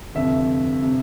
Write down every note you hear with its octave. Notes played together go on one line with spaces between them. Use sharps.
G1 F2 C3 E5
C3